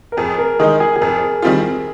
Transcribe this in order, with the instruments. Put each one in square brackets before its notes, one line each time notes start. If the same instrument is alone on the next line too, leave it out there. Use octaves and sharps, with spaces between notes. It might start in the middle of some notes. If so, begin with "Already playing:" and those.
[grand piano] A#4
[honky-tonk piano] F2 [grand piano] G#4
[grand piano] A#4
[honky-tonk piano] D#3 G#3 D#4 [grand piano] G#4
[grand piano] G#4
G#4
[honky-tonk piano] F2 [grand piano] A#4
[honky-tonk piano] D#3 G3 C4 F4